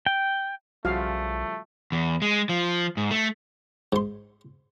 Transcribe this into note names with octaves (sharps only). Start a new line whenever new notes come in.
G5
B1 C#3 F3 G3 A3 F4 F#4 F5
E2
G#3
F3
G#2
A3
G#2 C6